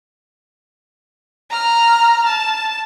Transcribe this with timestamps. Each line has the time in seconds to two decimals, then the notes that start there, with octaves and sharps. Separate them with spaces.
1.50 A#5 F6
2.26 A5